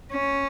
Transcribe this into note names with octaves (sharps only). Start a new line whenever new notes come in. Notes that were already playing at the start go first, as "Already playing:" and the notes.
C#4